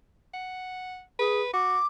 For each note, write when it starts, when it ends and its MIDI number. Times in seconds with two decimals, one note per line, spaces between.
0.34 1.01 78
1.19 1.41 68
1.19 1.49 71
1.53 1.78 66
1.53 1.86 86